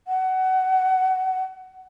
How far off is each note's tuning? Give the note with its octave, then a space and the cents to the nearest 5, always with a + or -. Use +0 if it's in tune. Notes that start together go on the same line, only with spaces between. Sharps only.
F#5 +20